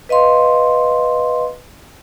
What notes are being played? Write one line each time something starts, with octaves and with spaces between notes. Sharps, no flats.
B4 D#5 F5 C6